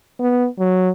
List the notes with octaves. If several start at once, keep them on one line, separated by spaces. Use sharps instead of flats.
B3
F#3